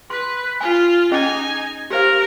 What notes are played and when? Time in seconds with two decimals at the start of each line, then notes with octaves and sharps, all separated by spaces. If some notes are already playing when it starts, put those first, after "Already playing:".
0.10 B4 C6
0.61 F4 G#5
1.12 C#4 D#4 G#4 D#5 G#5
1.90 G4 A#4 C5 F5